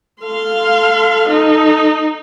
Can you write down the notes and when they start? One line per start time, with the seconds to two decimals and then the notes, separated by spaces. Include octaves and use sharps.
0.23 A4 F5 C6
1.29 D#4